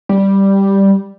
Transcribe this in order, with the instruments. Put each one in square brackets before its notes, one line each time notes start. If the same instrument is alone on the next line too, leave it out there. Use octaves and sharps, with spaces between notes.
[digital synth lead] G3